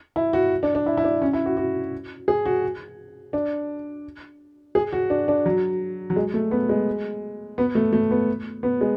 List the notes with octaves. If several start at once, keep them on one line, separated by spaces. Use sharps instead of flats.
E4
F#4
D4
D4
E4
E4
D4
C#4
E4
F#4
F#4
G#4
F#4
D4
G#4
F#4
D4
D4
F#3
F#3
G#3
A3
B3
G#3
B3
A3
A3
B3
B3
G#3